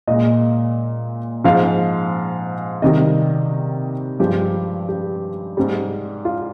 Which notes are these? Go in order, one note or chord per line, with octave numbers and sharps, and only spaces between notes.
A#2 G#3 D#5
G#2 F3 G#3 F5
C3 D#3 G3 D#5
G2 F3 G#3 G4
G4
G#2 G3
F4